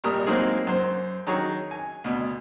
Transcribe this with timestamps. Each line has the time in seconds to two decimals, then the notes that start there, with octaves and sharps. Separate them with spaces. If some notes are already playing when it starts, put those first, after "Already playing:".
0.04 G#1 A#2 G3 A#4 D#6
0.26 F#3 G#3 A#3 C4 D#4 G#4
0.67 F#2 C5
1.27 D#3 F#3 G#4 C#5 A#5
1.71 G#5
2.04 D2 B2